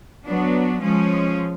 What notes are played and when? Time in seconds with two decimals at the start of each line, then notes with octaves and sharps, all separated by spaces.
0.25 F#3 B3 D4
0.81 F3 G#3 C#4